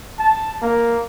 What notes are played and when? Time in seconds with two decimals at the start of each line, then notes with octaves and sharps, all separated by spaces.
0.19 A5
0.62 A#3